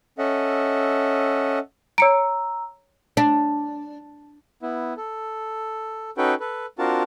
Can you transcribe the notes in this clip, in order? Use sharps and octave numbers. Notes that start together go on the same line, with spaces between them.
C#4 A4 D#5 E5 F#5
C#5 A#5 E6 C#7 D7
D4
B3 E4
A4
C#4 D#4 F#4 A4 B4 G5
A4 B4
C4 D4 F4 F#4 A#4 A5